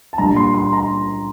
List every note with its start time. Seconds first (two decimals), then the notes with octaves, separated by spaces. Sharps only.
0.13 A5
0.18 A#2 G3 D4 A#5
0.36 C6
0.54 C6
0.73 A#5